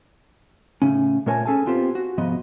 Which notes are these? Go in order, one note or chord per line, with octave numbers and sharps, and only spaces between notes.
A2 C#3 C#4
A#2 A3 A#4 C#5 G#5 A5
C#4 G#4 A4 G#5 A5
B3 C4 F4 G4 C5
F#4
C2 G#2 F3 B3 D#5